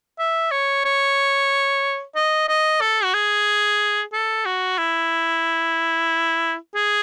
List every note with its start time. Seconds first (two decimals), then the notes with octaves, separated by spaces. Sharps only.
0.19 E5
0.51 C#5
0.85 C#5
2.16 D#5
2.49 D#5
2.81 A4
3.04 F#4
3.14 G#4
4.13 A4
4.46 F#4
4.78 E4
6.75 G#4